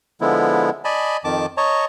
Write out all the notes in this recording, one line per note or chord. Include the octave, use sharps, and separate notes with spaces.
D3 F3 G#3 B3 E4
D5 D#5 G#5 A5 B5
F2 D#3 A5 D6
C#5 D#5 A5 A#5 C#6